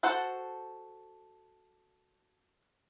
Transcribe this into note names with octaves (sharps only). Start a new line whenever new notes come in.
F#4 A4 C5 F#5 A5